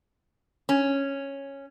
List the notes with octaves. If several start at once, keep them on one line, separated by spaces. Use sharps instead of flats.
C#4